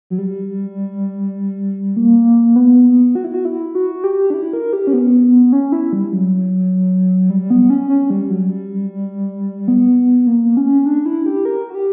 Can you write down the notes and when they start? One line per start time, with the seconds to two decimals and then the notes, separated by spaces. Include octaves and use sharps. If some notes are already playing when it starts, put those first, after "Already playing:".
0.10 F#3
0.18 G3
1.96 A#3
2.56 B3
3.15 F#4
3.24 E4
3.34 F#4
3.45 E4
3.75 F#4
4.04 G4
4.30 D4
4.34 E4
4.53 A#4
4.73 G4
4.87 C#4
4.93 B3
5.53 C#4
5.72 E4
5.93 G3
6.12 F#3
7.30 G3
7.50 B3
7.70 C#4
7.89 C#4
8.10 G3
8.30 F#3
8.49 G3
9.68 B3
10.27 A#3
10.57 C#4
10.86 D4
11.06 E4
11.26 G4
11.45 A#4
11.70 F#4
11.75 G4